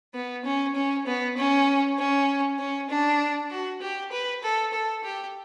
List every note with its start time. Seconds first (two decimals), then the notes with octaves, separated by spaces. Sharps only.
0.14 B3
0.45 C#4
0.75 C#4
1.06 B3
1.37 C#4
1.98 C#4
2.59 C#4
2.90 D4
3.51 F#4
3.81 G4
4.12 B4
4.43 A4
4.73 A4
5.04 G4